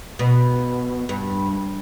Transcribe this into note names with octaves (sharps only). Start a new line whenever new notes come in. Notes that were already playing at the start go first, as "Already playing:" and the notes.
B2
G2